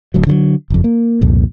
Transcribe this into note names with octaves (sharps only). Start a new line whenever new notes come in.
D1 D2 F#3
D3 D#3 F#3
F#1 F2
A#3
C2 F2 A#2